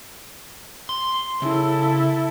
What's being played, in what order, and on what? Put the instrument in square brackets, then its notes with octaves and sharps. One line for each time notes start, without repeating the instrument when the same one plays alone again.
[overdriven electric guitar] C6
[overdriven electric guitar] C#3 [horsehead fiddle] E4 A4